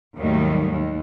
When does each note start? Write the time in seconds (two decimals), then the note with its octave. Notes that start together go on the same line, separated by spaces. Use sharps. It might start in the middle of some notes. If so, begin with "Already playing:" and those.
0.18 D#2 G#2 D#3 F#3 G3 A3
0.71 D#2